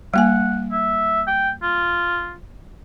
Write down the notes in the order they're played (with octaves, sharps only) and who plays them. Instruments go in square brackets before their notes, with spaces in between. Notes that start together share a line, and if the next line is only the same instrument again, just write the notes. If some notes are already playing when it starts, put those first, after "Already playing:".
[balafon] G3 A#3 G#5 [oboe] F#5
[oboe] E5
G5
F4